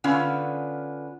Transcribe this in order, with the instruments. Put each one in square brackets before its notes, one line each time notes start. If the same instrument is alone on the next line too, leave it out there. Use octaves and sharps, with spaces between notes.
[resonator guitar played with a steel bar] D3 B3 C#4 F4